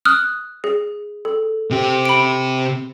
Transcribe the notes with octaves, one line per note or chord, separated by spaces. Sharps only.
D#6 F6 F#6
G#4
A4
C3 G4
B5 D7